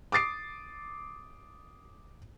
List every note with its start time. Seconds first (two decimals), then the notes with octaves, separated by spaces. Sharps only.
0.12 D6 D#6 A6 C7 D7